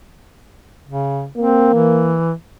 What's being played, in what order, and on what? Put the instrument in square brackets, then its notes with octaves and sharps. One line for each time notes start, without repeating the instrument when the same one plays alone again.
[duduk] C#3
[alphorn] A#3 [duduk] C4
[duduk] E3